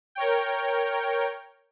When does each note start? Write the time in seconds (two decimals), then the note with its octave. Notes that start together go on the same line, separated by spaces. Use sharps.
0.15 A#4 C#5 G5